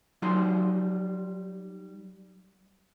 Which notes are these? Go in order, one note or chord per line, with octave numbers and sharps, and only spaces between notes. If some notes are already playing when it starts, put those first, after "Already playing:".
F#3 G3 D#4 F4 A#5 C6